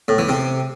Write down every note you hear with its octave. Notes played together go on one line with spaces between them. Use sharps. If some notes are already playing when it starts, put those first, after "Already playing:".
A2
E3
C3